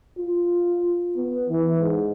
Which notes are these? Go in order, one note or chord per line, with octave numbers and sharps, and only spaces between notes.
F4
B3
E3
G#2